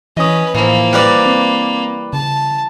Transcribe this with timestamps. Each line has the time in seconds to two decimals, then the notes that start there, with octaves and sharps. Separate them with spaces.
0.17 E3 C#4 B4 D#5 D#6
0.55 A2 E3 F3 A#3
0.93 G3 A#4 B4 D5
1.26 C4
2.13 C#3 A5